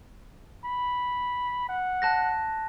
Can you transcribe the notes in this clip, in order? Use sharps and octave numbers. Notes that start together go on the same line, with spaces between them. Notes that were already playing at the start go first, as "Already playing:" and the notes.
B5
F#5
A5 F#6 A#6